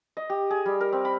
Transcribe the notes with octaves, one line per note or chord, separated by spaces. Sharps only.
D#5
G4
G#4
G3
A#4
C4
B5